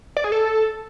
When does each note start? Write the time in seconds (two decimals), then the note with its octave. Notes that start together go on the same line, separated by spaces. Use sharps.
0.17 D5
0.24 G#4
0.32 A4